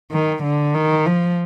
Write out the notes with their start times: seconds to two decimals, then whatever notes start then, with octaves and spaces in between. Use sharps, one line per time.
0.12 D#3
0.43 D3
0.74 D#3
1.06 F3